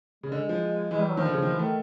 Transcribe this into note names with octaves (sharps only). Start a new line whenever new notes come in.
C#3 G#3
D3
F3
E3 G#3
G3
F#3
D#3 F3
D3
C#3
D#3
E3
D#3 A3